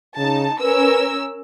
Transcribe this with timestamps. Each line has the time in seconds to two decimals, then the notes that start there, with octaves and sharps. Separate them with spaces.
0.17 C#3 D#4 A5
0.61 C#4 A#4 B4 E6